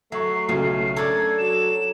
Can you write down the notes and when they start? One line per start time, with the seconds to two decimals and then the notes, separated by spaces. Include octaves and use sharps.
0.12 F#3 A3 E5 C#6 C7
0.49 B1 C#3
0.96 D4 A4 A#5 D6 G#6
1.38 F#3 E7